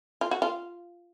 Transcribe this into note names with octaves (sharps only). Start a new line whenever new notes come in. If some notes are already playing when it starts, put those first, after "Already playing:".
F4
F#4
F4